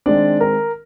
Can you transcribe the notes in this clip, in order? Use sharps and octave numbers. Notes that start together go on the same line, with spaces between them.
D#3 G#3 C4 D4 D5
A#4